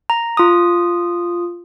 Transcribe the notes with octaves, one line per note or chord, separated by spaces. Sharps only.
A#5
F4 D#6